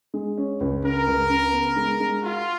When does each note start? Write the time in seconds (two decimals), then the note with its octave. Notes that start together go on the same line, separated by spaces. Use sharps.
0.14 G#3
0.38 C#4
0.60 C#2
0.83 C#3 A#4
1.07 C#2
1.29 C#3
1.52 B3
1.76 G#3
2.00 G#3
2.23 F4 F#4